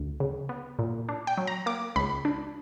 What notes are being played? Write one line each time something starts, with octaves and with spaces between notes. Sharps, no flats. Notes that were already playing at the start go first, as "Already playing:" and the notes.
Already playing: D2
C#3
B3
A#2
D4
G5
F#3
A#5
A#3 D6
C#2 B5
D4